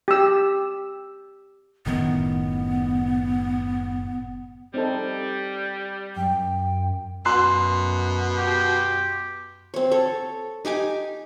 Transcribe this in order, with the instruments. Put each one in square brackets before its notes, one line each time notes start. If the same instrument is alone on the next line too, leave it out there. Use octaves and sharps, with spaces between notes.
[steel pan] G4 E6
[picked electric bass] F#1 A2 D#3 [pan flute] B3
[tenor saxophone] G3 [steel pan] C4 D#4 A4
[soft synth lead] F#2 [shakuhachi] G5
[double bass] F#2 [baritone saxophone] B2 [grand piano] C6 F#6 C7
[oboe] G4
[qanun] C4 C#5
A4 C#5
D#4 G4 G#5 D6